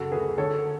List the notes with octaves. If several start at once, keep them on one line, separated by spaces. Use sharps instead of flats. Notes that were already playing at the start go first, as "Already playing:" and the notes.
Already playing: F#2 C#3 F#4 A4
D2 G#4 B4
D3 A4 C#5